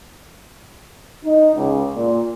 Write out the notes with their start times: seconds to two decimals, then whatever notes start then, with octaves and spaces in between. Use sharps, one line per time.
1.25 D#4
1.57 C#2
1.96 A#2